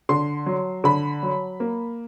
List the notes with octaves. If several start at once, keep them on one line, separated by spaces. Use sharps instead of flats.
D3 C6
F#3
D3 B5
F#3
A#3